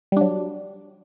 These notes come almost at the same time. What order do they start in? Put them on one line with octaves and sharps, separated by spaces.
G3 D4 F#3